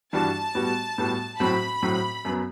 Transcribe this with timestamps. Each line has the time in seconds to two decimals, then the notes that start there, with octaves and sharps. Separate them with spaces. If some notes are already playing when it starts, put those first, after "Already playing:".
0.13 G2 E3 G3 D4 F#4 A5
0.55 A2 G3 B3 F#4
0.98 A2 G3 B3 F#4
1.40 A2 F#3 C4 F#4 B5
1.82 A2 F#3 C4 F#4
2.25 F#2 F#3 B3